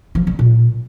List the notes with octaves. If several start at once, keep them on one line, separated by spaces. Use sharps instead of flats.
F3
G3
A#2